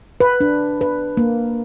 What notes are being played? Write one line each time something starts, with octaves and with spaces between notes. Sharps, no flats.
B4
D4
B4
A#3